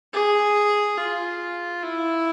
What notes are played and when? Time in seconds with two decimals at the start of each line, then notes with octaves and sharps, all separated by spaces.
0.13 G#4
0.98 F4
1.82 E4